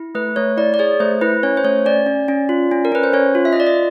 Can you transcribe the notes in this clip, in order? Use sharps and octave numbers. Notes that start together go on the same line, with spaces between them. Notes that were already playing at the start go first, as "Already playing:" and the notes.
Already playing: E4
A3 B4
A3 C#5
E4 D5
D5
G#4 C#5
A3 C5
E4 B4
C#4 C#5
C5
A3 C#5
C#4 D5
C#4
C#4
F4
C#4
A#4
C#4 B4
C5
C#4 C#5
F4
E5
D#5
F4 D5
D#5